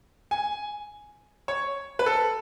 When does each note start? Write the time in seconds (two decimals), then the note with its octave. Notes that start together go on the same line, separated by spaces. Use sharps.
0.31 G#5
1.48 C#5
1.99 B4
2.06 A4